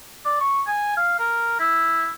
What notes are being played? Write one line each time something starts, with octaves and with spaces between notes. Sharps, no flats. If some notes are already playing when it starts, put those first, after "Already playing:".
D5
C#6
G#5
F5
A#4
E4